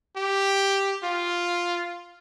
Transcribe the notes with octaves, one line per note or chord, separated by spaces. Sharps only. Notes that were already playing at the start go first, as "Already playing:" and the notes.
G4
F4